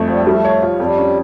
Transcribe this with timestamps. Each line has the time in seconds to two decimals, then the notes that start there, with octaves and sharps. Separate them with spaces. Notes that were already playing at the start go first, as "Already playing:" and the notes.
Already playing: F2 A3
0.08 F3 G3
0.27 G3 A3
0.45 C#5
0.62 F4
0.80 F2 G3
0.98 C#4